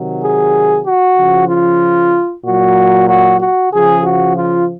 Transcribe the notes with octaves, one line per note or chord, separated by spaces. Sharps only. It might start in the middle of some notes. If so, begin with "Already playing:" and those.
Already playing: C3 D#3 F#3
G#4
F#4
C#3 F3
F4
A#2 F#3 F#4
F#4
F#4
C#3 F3 G#4
F#4
F4